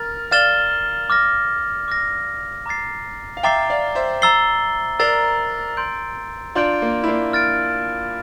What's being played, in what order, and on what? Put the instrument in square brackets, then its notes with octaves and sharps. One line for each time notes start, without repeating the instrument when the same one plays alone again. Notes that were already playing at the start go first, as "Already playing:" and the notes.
Already playing: [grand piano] A#4 [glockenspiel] F6 A6
[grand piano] D5 F5 [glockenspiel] F6 A6 E7 G7
[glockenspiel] D6 F6 A#6
D6 F6 A#6
A#5 D6 A6 C7
[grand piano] F5
[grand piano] E5 G5 [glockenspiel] A#5 D6 A6 C7
[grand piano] D5 F5
C5 E5
[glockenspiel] A#5 E6 A6 C7 G7
[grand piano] A#4 D5 [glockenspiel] A#5 E6 A6 C7 G7
[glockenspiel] C6 G6 D7
[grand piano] D4 F4 [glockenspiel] C6 G6 D7
[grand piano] A#3
E4
A#3 D4
[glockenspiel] F6 A6 D7